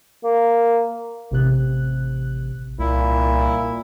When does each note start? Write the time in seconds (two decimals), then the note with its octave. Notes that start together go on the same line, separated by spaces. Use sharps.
0.24 A#3
1.31 A1 C3 F#6
2.79 C2 A#2 E4